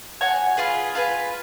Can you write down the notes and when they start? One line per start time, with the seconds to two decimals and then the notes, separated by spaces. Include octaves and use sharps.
0.21 F#4 C#5 G#5
0.57 F4 G#4 B4
0.95 F4 G#4 B4